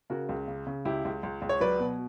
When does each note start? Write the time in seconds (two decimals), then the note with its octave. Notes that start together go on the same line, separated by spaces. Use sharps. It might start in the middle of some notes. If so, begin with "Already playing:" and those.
0.10 C#3 F#4 A#4
0.29 C#2
0.48 C#3
0.67 C#3
0.85 C#2 E4 G4
1.05 C#2
1.23 C#2
1.42 C#2
1.49 C#5
1.60 F#3 B4 D5
1.79 B2